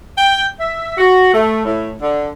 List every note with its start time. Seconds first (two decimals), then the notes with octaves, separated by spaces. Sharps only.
0.18 G5
0.60 E5
0.97 F#4
1.34 A3
1.65 A2
2.01 D3